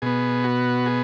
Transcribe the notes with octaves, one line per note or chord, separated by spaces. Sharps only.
B2 B3 G#4
F#4
G#4